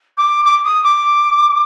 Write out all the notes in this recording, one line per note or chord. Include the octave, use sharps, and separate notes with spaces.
D6
D6
D#6
D6